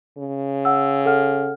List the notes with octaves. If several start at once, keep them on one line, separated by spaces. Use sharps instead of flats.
C#3
F#5 E6
A4 F#5 F6